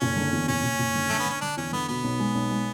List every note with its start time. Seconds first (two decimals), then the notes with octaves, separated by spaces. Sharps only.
0.01 F#1 C#4
0.16 D3
0.32 E2
0.48 F#1 C#4
0.64 F#1
0.79 F#1
0.95 D3
1.09 D3 A3
1.19 B3
1.26 D3 C#4
1.41 D3 D4
1.57 E2 C#4
1.72 D3 B3
1.88 B2 B3
2.04 B1
2.20 G#3
2.35 B1
2.51 G#3